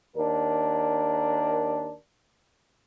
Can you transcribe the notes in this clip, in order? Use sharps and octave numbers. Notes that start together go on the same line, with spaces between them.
D#2 D4 A#4